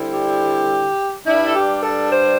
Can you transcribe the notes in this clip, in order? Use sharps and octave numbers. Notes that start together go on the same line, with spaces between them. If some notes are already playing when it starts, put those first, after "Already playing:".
Already playing: D3 G3 C4 E4
G4
G2 G3 D4 E4
A4
G4
A4
C5